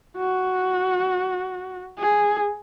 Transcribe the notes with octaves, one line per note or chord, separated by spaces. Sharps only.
F#4
G#4